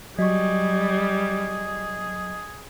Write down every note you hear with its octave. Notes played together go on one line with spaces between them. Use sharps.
F#3 G3 G#4 D#5 C#6